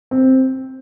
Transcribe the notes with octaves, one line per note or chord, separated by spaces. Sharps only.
C4